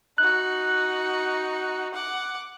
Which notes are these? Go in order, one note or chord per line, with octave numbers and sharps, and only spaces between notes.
D#4 F#4 F#6
F#5 D6